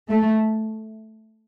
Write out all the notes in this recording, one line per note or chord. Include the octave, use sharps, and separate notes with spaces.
A3